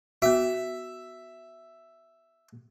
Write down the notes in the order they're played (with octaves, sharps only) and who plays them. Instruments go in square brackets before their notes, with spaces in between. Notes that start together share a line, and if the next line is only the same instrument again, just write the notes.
[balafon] B3 F#4 [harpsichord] E5